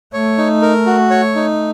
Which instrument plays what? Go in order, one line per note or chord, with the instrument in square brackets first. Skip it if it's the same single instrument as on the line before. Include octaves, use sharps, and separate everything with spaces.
[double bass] A3 [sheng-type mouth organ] C#5
[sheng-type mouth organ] D#4
A#4
F#4
C#5
D#4